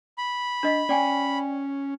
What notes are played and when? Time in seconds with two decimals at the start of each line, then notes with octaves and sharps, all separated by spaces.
0.18 B5
0.63 D4 D#5 B6
0.89 C#4 D5 G5 G#5